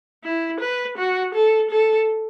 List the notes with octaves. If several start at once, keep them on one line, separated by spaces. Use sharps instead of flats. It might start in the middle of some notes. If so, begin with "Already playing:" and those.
E4
B4
F#4
A4
A4